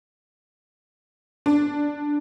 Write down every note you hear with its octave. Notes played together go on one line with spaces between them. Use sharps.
D4